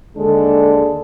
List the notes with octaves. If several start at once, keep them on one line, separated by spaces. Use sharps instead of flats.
D#2 D3 G#3 D4 G#4 A4